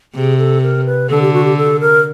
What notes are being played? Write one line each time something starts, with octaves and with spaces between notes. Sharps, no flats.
C3 G#4
A4
A#4
B4
D3 A4
G4
F#4
G4
A4
A#4